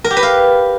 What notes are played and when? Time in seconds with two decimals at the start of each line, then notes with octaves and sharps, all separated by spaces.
0.04 A#4
0.11 G4
0.17 B4
0.23 F5